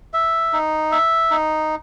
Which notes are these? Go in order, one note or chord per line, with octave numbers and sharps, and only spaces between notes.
E5
D#4
E5
D#4